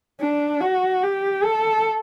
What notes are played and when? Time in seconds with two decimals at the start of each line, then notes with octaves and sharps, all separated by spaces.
0.20 D4
0.61 F#4
1.03 G4
1.44 A4